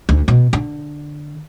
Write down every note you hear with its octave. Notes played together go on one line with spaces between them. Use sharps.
D2
B2
D3